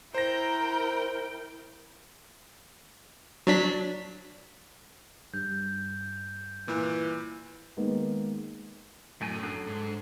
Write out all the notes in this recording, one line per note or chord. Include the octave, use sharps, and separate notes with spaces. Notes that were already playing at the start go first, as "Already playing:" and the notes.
E4 A#4 C5 G5 A#5 A#6
F#3 D4 B6
G2 G6
A#2 E3
D#3 G#3 A#3 B3
F#2 A2 A3 G#5
F#3 D4 A4
G#2